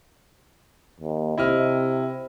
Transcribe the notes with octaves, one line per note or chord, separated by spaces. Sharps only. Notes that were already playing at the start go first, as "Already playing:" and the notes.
D#2
C3 E4 D#5 F6